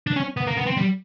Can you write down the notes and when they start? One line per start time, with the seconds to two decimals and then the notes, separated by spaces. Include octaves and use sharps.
0.07 D4
0.16 C#4
0.37 B3
0.47 A#3
0.57 B3
0.66 C4
0.77 G3